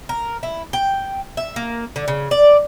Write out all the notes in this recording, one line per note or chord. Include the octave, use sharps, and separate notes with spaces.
A#4
E4
G5
E5
A#3
D3
C#3
D5